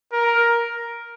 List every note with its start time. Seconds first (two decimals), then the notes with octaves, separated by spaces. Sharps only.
0.13 A#4